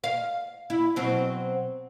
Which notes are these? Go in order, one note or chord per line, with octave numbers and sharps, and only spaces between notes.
F5
E4
B2 F#3 C4